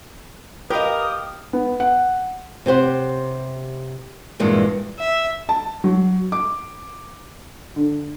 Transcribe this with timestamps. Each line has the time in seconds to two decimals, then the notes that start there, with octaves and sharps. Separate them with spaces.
0.70 G4 A#4 B4 D#5 F5 D#6
1.53 B3
1.80 F#5
2.66 C3 G4 C5 F#5
4.40 E2 G2 A#2 E3 G#3
4.99 E5
5.49 A5
5.84 F#3
6.32 D6
7.76 D3